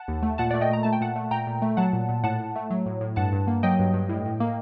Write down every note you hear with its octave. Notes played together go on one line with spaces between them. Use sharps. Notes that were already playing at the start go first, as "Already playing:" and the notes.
Already playing: F#5 A5
D#2
A3
A#2 F#5 A5
A3 D5 F#5
D#5 G5
A#2 A#5
A3 A5
G5
A#2 F#5 A5
A3
A#2 G5 A#5
A#2
A3
F#3 F#5 A5
A#2
A#2
A2 F#5 A5
A2
A3
F#3
A2
A2
G2 F#5 A5
G2
A#3
F#3 D#5 G5
G2
G2
A2
A2
A#3